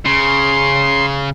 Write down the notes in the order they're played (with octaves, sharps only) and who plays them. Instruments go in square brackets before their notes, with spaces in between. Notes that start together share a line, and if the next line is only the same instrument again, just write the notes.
[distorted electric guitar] C#3 [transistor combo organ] C6